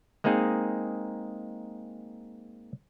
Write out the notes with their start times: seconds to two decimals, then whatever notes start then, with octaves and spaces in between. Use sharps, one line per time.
0.24 G#3 A#3 C4 D#4 G#4